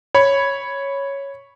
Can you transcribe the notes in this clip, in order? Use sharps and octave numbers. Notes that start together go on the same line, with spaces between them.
C#5 B5